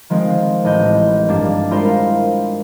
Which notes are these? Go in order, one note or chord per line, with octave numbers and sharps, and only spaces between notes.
D#3 F3 G#3 C4
A1 D#5 G6
G2 A#3 D4
G#3 E4 F4 A#4 C5 F5